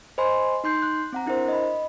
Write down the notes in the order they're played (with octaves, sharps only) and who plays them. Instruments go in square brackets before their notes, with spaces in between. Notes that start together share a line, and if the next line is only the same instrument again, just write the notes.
[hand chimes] C5 D#5 G#5 B5 C6
D#4 C6 G6 C7
F#6
C4 F#5 A#5
D4 E4 A#4 C5
D#5 B5